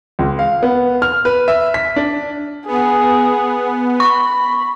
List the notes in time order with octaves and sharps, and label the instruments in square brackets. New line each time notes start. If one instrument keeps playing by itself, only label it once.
[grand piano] C#2
F5
B3
F6
B4
E5
B6
D4
[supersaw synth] B3 [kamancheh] G#4
[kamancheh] B5 [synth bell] C#6